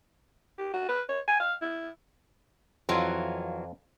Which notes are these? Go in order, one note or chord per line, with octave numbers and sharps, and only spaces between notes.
G4
F#4
B4
C#5
G#5
F5
E4
F2 E3 F#3 F4 D5